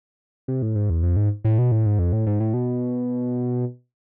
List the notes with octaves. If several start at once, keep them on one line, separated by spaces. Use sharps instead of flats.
C3
A2
G#2
E2
F2
G#2
A2
B2
A2
G#2
F2
A2
G#2
A2
B2